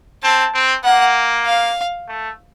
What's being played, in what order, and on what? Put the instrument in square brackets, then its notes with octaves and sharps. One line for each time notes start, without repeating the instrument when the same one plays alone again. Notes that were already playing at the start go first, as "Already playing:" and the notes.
[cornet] C4 [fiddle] A5
[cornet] C4
[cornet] A#3 [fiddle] F#5
[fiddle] F5
[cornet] A3